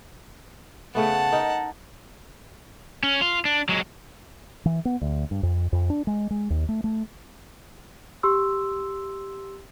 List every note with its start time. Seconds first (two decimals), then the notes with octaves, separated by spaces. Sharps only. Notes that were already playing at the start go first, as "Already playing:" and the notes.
0.95 C#3 A3 B3 F#5 A5
1.32 D#4 A#4
3.03 C#4
3.21 F4
3.45 D4
3.69 F#3 G#3
4.66 E3
4.85 B3
5.02 D2
5.31 G2
5.43 F2
5.73 F2
5.90 D4
6.07 G#3
6.31 G#3
6.50 D#2
6.69 A3
6.84 A3
8.23 G4 C6 E6